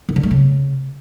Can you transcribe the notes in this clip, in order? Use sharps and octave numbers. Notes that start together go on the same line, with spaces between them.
D#3
D3
A3
C#3